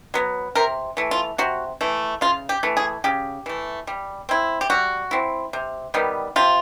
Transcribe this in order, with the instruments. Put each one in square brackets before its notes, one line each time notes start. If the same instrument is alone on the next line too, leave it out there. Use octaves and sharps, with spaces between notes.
[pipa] F#3 B3
C3 A#4
E3 A3
F4
C3 F#4
E3 A3
C#3 F4
G4
E3 A3
G#4
C#3 G4
E3 A3
G3
C4 E4
G4
G3 F#4
C4 E4
C3
D#3 G3 B3
C3 F4